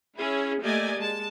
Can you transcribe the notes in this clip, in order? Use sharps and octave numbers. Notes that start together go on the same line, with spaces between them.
C#4 E4 G#4
A3 A#3 G4 D5 D#5 G#5
G#3 A5